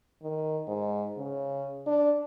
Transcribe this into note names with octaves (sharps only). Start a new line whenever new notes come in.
D#3
G#2
C#3
D4